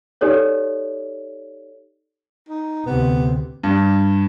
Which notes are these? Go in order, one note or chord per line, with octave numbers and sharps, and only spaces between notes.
D#4 G4 A4 C#5 D5
D#4
D2 C3 B3
G2